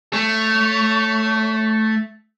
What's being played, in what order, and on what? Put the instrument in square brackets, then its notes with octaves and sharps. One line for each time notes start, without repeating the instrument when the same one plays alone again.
[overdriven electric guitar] A3 [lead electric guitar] C#5